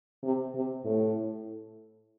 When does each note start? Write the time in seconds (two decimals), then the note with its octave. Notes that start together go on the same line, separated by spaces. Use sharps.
0.23 C3
0.55 C3
0.85 A2